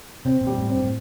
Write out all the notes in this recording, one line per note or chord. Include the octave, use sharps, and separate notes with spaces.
C3 C4
A#2
G3
A2
C4
G2
A2